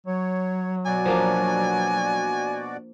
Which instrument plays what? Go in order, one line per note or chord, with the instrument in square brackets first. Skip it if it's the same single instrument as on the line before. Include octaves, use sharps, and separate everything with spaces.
[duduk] F#3 [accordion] C#5
[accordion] B2 F#4 D5 [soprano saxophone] G#5
[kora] F3 A#3 D4